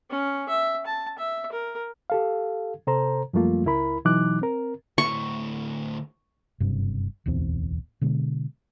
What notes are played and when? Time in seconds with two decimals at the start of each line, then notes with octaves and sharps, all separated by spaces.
0.10 C#4
0.49 E5
0.86 A5
1.18 E5
1.52 A#4
2.10 G4 A4 F5
2.87 C3 A4 C5 A#5
3.33 F#2 F3 G3 A3 A#3 F4
3.66 C#2 E4 A#4 B5
4.05 B2 E3 F#3 D#4 D6 F#6
4.42 C4 A#4
4.98 D2 A2 C#6
6.60 F#1 G2 C3
7.26 D1 B1 E2 C4
8.01 B2 D3 G#3